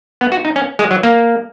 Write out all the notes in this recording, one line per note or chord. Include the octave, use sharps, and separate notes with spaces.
B3
F#4
D#4
C#4
G#3
F#3
A#3